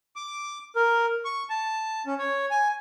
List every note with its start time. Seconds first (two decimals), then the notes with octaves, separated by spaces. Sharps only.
0.16 D6
0.76 A#4
1.25 C#6
1.49 A5
2.06 C#4
2.19 C#5
2.51 G#5